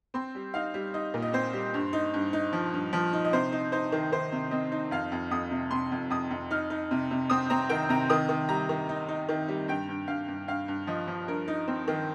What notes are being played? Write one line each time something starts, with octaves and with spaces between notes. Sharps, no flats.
C4 C6
G3
D#4 F5
G3
D#4 D#5
A#2
D#5
C4 C5
G3
G2
D#4
G2
D#4
F3
G2
F3
D#4
D#5
C3 C5
D#4
D#4 C5
D#3
D#3 C5
C3
C4 D#5
D#4
F2 F5
F2
F2 D#6
C3
C3 C6
F2
F2 D#6
F2
D#4 F6
D#4
C3
C3
C4 D#6
C4 A#5
D#3 G5
C3 A#5
D#3 D#6
D#3
G3 A#5
D#3
D#4
D#4
D#3
G3
G2 G5
G2
G2 F5
G2
G2 F5
G2
F3 D#5
F3
G2 A#4
D#4
C4
D#3